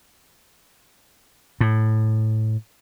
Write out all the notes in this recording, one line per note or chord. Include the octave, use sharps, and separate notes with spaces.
A2